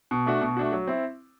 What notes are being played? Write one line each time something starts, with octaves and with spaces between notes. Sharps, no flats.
B2
A3 D4 F#4
B2
A3 D4 F#4
F#3
C4 E4